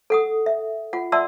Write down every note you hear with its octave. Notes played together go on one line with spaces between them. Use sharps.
A4 F#5 D#6
E5
F4 F#5
D5 E5 F#5 A5 C6 E6